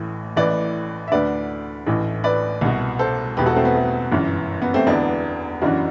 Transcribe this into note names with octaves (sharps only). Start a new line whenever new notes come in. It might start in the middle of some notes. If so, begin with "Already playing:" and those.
Already playing: A1 A2 E3
A1 A2 E3 B4 D5
E5
D2 D3 B4 D5
A1 A2 E3
B4 D5
C2 B2
A4 C5
E1 E2 B2 G4 B4
F#4 A4
A3 C4
B3
A3
G1 F#2 E3
B3
A3 C4
E1 E2 D3 B3 D4
F#1 F#2 E3 D4 F#4